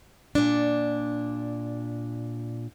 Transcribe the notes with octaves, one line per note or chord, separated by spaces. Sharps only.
A#2 D4